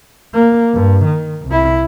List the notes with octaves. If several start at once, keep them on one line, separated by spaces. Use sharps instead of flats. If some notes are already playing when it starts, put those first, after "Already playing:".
A#3
G2
D#3
C2 E4